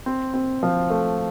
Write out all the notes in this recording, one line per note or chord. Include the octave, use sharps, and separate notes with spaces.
C4
C4
F3
A3